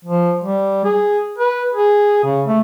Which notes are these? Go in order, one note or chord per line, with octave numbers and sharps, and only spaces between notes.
F3
G3
G#4
B4
G#4
C#3
A3